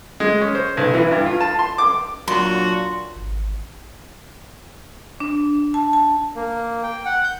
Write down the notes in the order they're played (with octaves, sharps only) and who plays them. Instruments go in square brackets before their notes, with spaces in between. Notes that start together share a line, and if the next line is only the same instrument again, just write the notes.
[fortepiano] G#3
C#4
C5
B1
E3
G2
F4
A5
C6
D6
[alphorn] A#2 [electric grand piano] F#3 D4 [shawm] F#4 [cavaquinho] C6
[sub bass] G#1
[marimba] D4
A5
A5
[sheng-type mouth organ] A#3
G5
F#5
G6